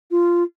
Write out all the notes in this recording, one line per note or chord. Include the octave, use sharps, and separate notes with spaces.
F4